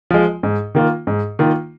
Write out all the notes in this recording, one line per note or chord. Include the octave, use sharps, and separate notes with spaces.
F3 G#3
G#2
D#3 A#3 F4
G#2
D#3 A#3 F4